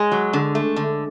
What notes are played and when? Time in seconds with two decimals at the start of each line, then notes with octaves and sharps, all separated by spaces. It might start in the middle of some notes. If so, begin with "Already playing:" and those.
Already playing: G#3
0.12 F#3
0.33 D3
0.55 A3
0.76 D3